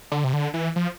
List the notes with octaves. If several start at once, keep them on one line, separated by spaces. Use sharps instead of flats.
D3
C3
D3
E3
F3